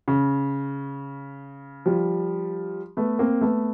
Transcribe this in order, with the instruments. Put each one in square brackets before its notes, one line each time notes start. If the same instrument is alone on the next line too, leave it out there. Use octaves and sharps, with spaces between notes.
[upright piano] C#3
F3 G3
A3 B3
A#3 C4
A3 B3